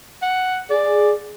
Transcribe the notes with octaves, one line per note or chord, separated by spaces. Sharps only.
F#5
G#4 D5